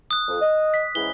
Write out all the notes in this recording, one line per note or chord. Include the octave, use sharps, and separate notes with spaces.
D#6 F#6
F2
D#5
B6
G#2 C#3 E3 G7